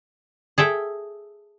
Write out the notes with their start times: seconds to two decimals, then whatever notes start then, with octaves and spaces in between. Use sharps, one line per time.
0.58 G#4 A4 E5 G5